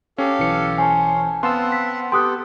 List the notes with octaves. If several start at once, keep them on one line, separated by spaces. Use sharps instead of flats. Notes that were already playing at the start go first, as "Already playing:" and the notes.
C#4 G4 A4 F5
B1 E3 C#7
C5 C#5 G#5 A5
B3 C4 F5 F#5 A5 C6 E6
B6
B3 G4 A4 G5 C6 D#6 F#6